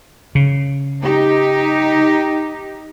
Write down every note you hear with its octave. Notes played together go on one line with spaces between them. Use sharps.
C#3
D#4 G4